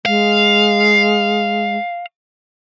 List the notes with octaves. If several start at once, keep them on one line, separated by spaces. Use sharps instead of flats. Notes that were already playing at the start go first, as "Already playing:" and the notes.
G#3 F5